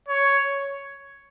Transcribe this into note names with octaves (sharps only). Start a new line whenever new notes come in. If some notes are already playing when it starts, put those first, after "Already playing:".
C#5